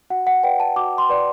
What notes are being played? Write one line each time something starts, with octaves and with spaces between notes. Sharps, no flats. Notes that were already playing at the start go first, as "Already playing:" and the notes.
F#4 F#5
F#5
B4 D5 G5
A5
F#4 D6
C6
B4 D5